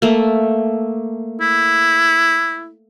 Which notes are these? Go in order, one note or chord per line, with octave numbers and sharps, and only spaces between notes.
A3 A#3
E4